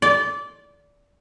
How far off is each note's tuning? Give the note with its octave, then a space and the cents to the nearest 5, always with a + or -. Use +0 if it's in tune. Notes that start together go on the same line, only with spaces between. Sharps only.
D5 -20